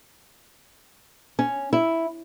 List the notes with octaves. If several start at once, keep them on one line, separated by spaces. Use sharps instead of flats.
C#4
E4